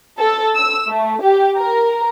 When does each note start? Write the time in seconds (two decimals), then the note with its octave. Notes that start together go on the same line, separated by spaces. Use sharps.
0.19 A4
0.56 E6
0.90 A3
1.23 G4
1.58 A#4